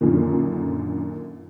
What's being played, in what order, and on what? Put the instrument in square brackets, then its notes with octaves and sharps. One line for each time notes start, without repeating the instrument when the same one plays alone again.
[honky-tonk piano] F#2 A#2 D3 D#3